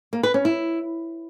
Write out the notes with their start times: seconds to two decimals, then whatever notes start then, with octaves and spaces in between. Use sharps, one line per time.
0.13 A#3
0.23 B4
0.34 C#4
0.45 E4